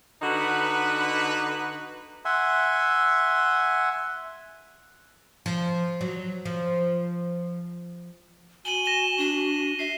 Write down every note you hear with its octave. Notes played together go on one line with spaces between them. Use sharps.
D3 D#4 F#4 B4
E5 F#5 G#5 C6
F3
F#3
F3
F#4 G#5 D#7 F#7 G7
A#6 E7 G7
D4
E5 C7